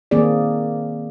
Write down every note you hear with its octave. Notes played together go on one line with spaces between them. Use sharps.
D#3 A#3 C4 G#4 D5